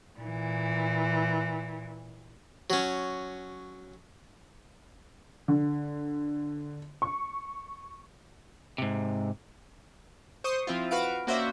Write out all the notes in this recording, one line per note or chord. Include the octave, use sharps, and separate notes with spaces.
A#2 E3
F#3 C#4
D3
C#6
G#2 C3
C5 C#6 D#6
F3 C4 E4 F4
F#4 B4 F5 D7
A#3 C#4 F#4 C5 D5 E5